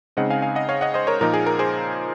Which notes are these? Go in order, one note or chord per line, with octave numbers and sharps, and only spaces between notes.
C#3 G#3 C4 D#4 D#5 F#5
F5 G#5
F5 G#5
D#5 F#5
C#5 F5
D#5 F#5
C5 D#5
A#4 C#5
A#2 F3 A#3 D#4 A#4
G#4
A#4
G#4 C5